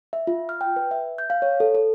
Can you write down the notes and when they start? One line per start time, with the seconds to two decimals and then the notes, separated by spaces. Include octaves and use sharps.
0.13 E5
0.27 F4
0.49 F6
0.61 G5
0.76 B4
0.91 E5
1.18 G6
1.30 F5
1.42 C#5
1.60 A4
1.75 A4